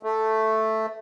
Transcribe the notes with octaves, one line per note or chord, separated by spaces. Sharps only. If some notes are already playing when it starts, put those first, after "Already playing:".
A3